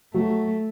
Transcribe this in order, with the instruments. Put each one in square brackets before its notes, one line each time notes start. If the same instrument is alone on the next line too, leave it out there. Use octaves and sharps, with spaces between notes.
[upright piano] F#3 [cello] A3